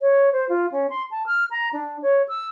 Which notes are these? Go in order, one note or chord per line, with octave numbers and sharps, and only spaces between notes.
C#5
C5
F4
C#4
C6
A5
F6
A#5
D4
C#5
E6